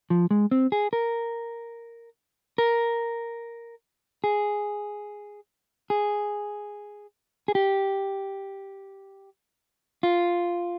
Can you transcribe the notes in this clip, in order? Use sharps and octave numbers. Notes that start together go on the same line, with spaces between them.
F3
G#3
C4
G#4
A#4
A#4
G#4
G#4
G#4
G4
F4